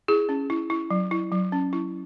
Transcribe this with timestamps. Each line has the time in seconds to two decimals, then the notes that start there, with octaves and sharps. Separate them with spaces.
0.08 E4 G#4
0.29 C#4
0.50 E4
0.70 E4
0.91 F#3
1.11 E4
1.32 F#3
1.52 C#4
1.73 E4